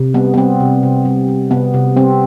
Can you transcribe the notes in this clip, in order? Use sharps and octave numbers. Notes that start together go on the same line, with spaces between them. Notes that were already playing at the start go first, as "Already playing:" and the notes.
Already playing: C3
G3 B3
B3
G3 C4
C3
C3
G3
G3
C3 B3
C3
G3 C4